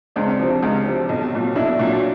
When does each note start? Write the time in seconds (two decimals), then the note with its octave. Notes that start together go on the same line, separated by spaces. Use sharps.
0.16 C#2 C4 D4
0.40 C3 F3
0.63 C#2
0.86 C3 F3
1.09 B1
1.32 A#2 F#3
1.56 B1 D4 E4
1.79 A#2 F#3